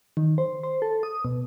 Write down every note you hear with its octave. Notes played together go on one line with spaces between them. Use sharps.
D#3
C5
C5
A4
D#6
B2